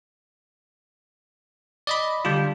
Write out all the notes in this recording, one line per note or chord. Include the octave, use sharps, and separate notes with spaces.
D5 D#5 B5
D3 G3 D4 F4